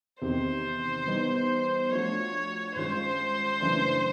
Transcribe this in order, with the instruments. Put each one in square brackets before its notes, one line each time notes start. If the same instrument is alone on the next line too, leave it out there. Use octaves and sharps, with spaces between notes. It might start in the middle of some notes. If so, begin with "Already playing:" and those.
[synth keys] E2 C3 D#3 [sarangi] C5
[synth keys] E3 G3 B3 D#4
[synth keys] F3 A3 D4 F#4 [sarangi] C#5
[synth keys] G2 D#3 G#3 C#4 F4 [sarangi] C5
[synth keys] F#2 C#3 E3 A3 D4